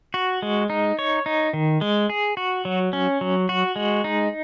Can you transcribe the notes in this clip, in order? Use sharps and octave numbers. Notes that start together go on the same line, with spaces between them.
F#4
G#3
D#4
C#5
D#4
D#3
G#3
G#4
F#4
F#3
C#4
F#3
F#4
G#3
D#4